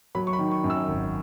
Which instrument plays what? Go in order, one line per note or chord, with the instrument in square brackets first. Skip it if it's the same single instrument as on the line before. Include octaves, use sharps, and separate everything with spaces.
[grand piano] F#3 B5
C#6
B5
D#3
C#6
F#2
E6
G#1